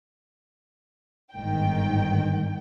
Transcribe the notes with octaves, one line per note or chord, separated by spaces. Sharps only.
G1 G#2 D#3 G5